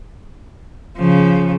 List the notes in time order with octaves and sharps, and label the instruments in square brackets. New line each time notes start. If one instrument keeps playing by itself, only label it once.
[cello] C#3 F3